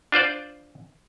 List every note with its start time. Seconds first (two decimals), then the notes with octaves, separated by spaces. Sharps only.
0.12 D4 F4 C5 D5